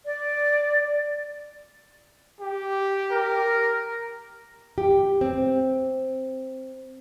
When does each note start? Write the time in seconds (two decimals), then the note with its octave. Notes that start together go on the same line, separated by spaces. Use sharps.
0.05 D5
2.41 G4
3.11 A#4
4.78 G4
5.21 C4